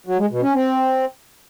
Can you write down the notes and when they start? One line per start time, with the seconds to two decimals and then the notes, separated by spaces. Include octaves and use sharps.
0.06 F#3
0.18 G#3
0.30 B2
0.42 C#4
0.54 C4